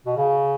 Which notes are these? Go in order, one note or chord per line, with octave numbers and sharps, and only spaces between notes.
B2
C#3